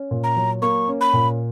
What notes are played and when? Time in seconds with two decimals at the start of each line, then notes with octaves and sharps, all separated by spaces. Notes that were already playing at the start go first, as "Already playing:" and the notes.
Already playing: C#4
0.11 A#2
0.24 A#5
0.37 F#3
0.62 A#3 C#6
0.88 C#4
1.01 B5
1.13 A#2